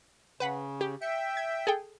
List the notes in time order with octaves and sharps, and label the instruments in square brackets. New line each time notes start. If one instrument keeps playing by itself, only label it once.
[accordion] C#3 [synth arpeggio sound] B4 F#5 B6
[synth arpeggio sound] G4
[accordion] E5 G5 [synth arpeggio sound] C#7
[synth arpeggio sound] G#6
G#4 A4 G5